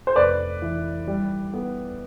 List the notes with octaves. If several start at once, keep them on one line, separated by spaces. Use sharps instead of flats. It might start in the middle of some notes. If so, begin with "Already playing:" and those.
C5
F1 B4 D5
E3
G3
B3